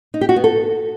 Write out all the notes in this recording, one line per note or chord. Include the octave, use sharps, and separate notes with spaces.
D#4
G4
F#4
B3
A4